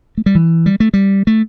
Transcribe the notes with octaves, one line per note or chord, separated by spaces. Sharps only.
A3
G3
E3
G3
A3
G3
A3